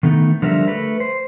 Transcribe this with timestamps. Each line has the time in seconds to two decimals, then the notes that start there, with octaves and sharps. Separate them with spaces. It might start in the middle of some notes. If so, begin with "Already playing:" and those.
0.03 D#3 A3 B3 D#4
0.42 D3 F3 G3 A#4 E5
0.68 A3 B4
1.00 C5